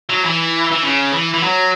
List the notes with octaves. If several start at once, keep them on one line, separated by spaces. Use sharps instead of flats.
F#3
E3
E3
C#3
E3
E3
F#3